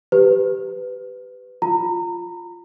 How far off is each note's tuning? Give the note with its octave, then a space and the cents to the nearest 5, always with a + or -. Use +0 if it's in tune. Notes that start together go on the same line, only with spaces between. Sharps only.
G4 +0 B4 +20
F4 +0 A#5 -25